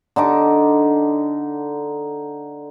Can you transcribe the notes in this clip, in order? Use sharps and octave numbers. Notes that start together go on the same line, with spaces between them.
D3 D#4 A5 D6